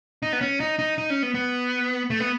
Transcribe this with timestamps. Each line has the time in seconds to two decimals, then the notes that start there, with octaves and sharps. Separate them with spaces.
0.22 D#4
0.33 B3
0.41 C#4
0.60 D#4
0.79 D#4
0.98 D#4
1.10 C#4
1.23 B3
1.34 B3
2.10 A3
2.20 B3